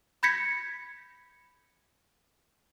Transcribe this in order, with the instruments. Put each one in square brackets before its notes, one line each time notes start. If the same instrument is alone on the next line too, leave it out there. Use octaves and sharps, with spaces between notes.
[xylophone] B5 G6 G#6 A#6 B6 C#7